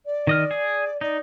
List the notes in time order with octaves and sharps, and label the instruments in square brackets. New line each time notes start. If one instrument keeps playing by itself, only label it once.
[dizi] D5
[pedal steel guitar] D#3 D#5 F6
G#4
[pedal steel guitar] D#4 [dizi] D5